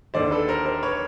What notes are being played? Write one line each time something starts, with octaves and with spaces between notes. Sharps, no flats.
D#2 D3 C5 D5
A4 B4
A#4 C5
A#4 C5
B4 C#5